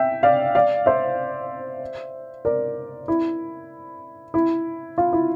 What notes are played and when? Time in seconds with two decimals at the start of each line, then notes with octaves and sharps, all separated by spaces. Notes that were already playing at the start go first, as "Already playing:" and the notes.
Already playing: E5 G5
0.23 D5 F5
0.55 D5 F5
0.86 C5 E5
2.45 A#4 D5
3.08 E4
4.34 E4
4.98 F4
5.13 E4